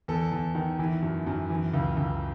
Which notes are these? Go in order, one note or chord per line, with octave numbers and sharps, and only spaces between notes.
E2 A4
E2
D#3
E3
F#2
F#2
E3
C#2
C#2